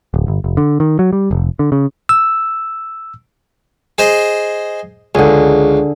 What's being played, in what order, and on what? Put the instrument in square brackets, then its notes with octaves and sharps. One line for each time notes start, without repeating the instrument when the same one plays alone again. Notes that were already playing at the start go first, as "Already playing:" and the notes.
[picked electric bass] D1
G1
F1
D3
D#3
F#3
G3
F1
D3
C#3
[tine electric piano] E6
[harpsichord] G#4 C5 D#5
[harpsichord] C#2 [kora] D3 G#4